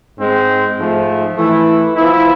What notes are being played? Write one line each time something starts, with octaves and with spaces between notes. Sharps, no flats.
G#2 G#3 C4
G#2 F3 A3
E3 A3 E4
F3 B3 E4